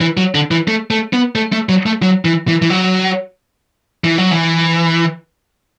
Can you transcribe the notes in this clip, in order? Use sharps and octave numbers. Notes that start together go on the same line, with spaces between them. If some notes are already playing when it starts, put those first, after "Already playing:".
E3
F#3
D3
E3
A3
A3
B3
A3
A3
F#3
A3
F#3
E3
E3
E3
F#3
E3
F#3
E3